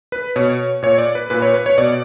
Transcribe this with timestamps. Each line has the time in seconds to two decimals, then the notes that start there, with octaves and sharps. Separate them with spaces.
0.12 B4
0.36 B2 C#5
0.82 A#2 C#5
0.98 D5
1.15 B4
1.30 A#2 B4
1.42 C#5
1.54 B4
1.66 C#5
1.78 B2 D5